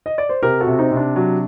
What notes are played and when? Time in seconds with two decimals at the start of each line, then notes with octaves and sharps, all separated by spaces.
0.06 D#5
0.18 D5
0.29 C5
0.43 C3 G4 A#4
0.61 F#4 A4
0.67 C3
0.72 F#4
0.79 C4 D#4
0.91 C3
0.97 D4
1.16 F#3